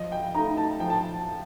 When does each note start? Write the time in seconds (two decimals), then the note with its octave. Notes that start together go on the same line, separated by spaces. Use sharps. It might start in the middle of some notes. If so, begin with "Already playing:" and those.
Already playing: F3 D#5
0.12 G5
0.34 A3 D#4 A#5
0.57 A5
0.80 F3 G5
0.90 A5